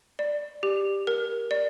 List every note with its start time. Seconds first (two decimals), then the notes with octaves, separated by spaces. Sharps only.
0.19 D5
0.63 G4
1.07 A#4
1.51 D5